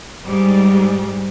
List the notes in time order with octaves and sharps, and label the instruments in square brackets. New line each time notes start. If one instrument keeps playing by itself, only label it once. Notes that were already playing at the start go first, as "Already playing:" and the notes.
[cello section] G#2 G3